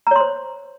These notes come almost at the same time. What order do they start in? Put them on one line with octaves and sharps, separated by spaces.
A#5 C#5 C6 C5